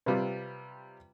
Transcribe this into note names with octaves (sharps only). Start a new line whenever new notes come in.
C3 G3 F4 B4 D5 F5